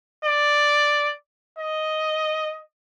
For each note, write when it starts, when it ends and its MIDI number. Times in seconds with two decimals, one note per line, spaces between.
0.25 1.12 74
1.58 2.61 75